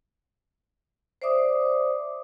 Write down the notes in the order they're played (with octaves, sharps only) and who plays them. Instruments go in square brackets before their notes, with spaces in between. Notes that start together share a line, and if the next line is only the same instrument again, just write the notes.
[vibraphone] C5 D5 E5 D6 D#6